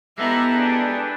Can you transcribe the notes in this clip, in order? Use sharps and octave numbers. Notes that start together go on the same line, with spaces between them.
G#3 B3 E4 G4 A4 B4 E5 A#5
D4 G#4